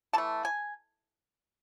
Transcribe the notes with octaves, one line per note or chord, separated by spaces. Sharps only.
E3 A3 A5
G#5